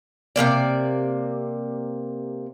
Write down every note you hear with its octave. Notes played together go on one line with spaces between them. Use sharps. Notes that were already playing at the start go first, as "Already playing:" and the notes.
C3 G3 A#3 D5